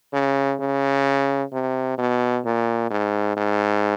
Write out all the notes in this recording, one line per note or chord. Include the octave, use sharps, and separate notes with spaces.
C#3
C#3
C3
B2
A#2
G#2
G#2